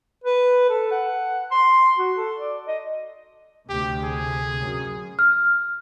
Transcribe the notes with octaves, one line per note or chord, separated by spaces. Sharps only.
B4
A4
F#5
C6
F#4
A4
D5
D#5
D2 C3 G4
G#4
F#2
F6